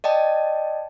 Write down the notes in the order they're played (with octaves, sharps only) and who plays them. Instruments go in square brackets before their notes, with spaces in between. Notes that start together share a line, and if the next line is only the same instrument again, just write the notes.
[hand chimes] D5 D#5 G5 A5